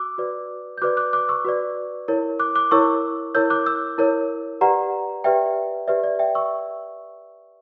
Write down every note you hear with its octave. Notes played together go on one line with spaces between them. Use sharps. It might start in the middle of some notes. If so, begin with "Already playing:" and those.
Already playing: F#4 D6 E6 F#6
F#4 B4 D5
G6
F#4 B4 D5 D6 F#6
D6 F#6
D6 F#6
C#6 E6
F#4 B4 D5
E4 A#4 C#5
D6 F#6
D6 F#6
E4 A#4 C#5 C#6 E6
E4 A#4 C#5 E6 G6
D6 F#6
E6 G6
E4 A#4 C#5
G4 B4 D5 F#5 A#5
G4 B4 D5 E5 G5
G4 B4 D5 E5
D5
E5 G5
C#6 E6